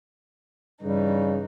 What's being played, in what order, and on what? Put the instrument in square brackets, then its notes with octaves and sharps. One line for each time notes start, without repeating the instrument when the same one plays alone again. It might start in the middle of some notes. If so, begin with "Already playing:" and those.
[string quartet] G2 E3 D#4 [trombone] C#3 [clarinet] G3